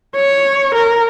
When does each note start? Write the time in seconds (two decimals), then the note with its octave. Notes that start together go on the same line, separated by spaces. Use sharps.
0.16 C#5
0.75 A#4